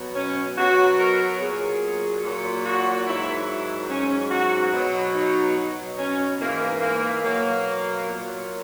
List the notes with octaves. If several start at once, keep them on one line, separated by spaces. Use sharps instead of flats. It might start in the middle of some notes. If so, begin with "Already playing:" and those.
Already playing: B2 F#3
C#4
B2 F#3 F#4
A#4
A#2 F#3 G#4
A#2 F#3
F#4
G#2 D#3 F#3 E4
E4
F#3 C#4
G#2
F#4
B2 F#3
D#4
B2 F#3
C#4
G#2 E3 A#3
A#3
B2 F#3 A#3
A#2 F#3